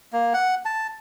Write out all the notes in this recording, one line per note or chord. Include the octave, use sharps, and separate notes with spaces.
A#3
F#5
A5